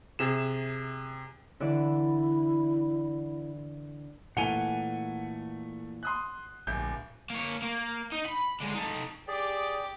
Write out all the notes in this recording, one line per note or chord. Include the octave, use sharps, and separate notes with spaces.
C3 G#4 E7
D3 E3 E4 D5
A#2 E3 A3 F#5 G#5 F7 G7
C6 D#6 F#6
D1 A#1 G6
A#3 C#5
A#3
D#4
B5
D3 G#3
D#4 A4
G4 G#4 D5 D6